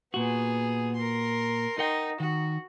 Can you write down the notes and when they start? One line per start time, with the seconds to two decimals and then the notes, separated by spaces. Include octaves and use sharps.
0.14 A#2 B3 F#4 G#4
0.96 A#4 C6
1.79 D#4 A#4 F#5 G5
2.20 D#3 F#4